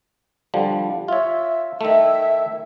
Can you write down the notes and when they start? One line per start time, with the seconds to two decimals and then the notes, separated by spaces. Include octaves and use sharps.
0.54 D3 F3 G3
1.08 F4 C#5 E5
1.81 D#3 A3 E5